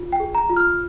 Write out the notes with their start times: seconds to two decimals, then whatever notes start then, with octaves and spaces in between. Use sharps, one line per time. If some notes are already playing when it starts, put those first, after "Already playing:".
Already playing: F4
0.12 G5
0.20 G#4
0.35 A#5
0.50 F4
0.56 F6